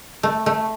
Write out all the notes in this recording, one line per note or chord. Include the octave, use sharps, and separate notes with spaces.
A3
A3